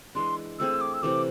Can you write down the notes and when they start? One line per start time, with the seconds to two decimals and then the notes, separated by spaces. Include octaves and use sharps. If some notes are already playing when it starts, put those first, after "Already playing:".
0.15 E3 G#3 D4 C6
0.59 A3 C4 G#4 E6
0.81 D6
0.94 E6
1.02 C3 E3 A3 D6